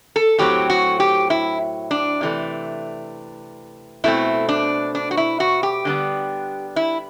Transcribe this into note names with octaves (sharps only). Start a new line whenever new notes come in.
A4
A2 F#3 C4 G4
F#4
G4
E4
D4
C3 E3 A3
B2 A3 C4 E4
D4
D4
F#4
E4
F#4
G4
D3 G3 B3 D4
E4